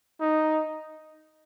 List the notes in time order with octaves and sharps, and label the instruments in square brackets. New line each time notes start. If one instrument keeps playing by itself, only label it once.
[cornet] D#4